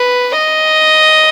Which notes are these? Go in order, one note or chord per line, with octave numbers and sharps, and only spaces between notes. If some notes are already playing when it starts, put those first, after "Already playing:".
Already playing: B4
D#5